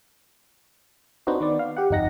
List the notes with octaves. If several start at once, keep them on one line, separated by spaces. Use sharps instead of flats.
B3 C4 D4 D#4 F#4 C5
D#3 B3 D5
F5
G4 F#5
G1 F2 D#4 F#5 A#6